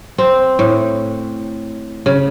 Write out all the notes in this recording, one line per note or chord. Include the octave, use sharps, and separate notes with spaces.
C4
A2
C#3